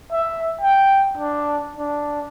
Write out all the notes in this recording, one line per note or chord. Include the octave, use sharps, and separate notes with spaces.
E5
G5
D4
D4